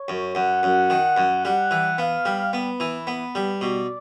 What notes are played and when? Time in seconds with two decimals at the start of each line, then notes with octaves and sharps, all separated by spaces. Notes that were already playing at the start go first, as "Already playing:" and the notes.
Already playing: C#5
0.08 F#2
0.35 F#2 F#5
0.63 F#2
0.90 D#3
1.17 F#2
1.45 G3 F#5
1.71 E3
1.98 B3 F5
2.25 G3
2.53 B3 B4
2.80 E3
3.07 B3
3.35 G3
3.61 B2 D5